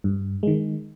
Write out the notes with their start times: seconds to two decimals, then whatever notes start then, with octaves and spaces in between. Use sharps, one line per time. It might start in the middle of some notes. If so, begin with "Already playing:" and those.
0.04 G2
0.43 D#3 G#3